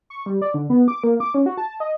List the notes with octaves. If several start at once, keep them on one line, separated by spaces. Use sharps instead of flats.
C#6
G3
D5
D3
B3
D6
A#3
D6
C#4
F#4
A5
D#5